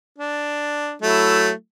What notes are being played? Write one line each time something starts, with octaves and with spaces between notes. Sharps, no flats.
D4
F#3 A3 E4